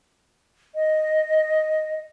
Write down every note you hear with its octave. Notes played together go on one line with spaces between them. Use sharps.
D#5